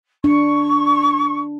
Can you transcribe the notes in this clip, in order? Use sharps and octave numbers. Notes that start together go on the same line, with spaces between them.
D4 C#6